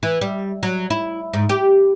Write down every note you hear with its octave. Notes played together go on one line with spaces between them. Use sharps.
E3
G3
F#3
E4
G#2
G4